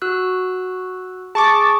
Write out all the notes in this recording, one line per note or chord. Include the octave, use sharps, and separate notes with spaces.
F#4 E6 F#6
G#4 A5 C#6 D6